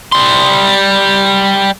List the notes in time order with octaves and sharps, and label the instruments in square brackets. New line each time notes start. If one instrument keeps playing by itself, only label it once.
[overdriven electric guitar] G3 C6